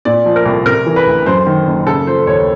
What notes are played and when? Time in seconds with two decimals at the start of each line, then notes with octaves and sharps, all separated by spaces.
0.05 A#2 D5
0.26 F3
0.36 A#4
0.46 C2
0.66 C3 A#4
0.87 E3
0.96 B4
1.06 D2
1.26 F#2 C5
1.47 D#3
1.67 F#1
1.87 C#3 A4
2.07 F3 C5
2.27 D#2 C#5